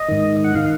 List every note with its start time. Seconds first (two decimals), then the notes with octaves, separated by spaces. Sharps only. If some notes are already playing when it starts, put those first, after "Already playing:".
Already playing: D#5
0.09 G#2 D#3
0.44 F#5
0.55 D#3 F5